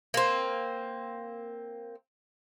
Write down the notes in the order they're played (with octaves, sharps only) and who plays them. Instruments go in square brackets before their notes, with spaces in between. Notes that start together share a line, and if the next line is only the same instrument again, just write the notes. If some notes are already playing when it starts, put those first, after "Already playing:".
[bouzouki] A#3 C4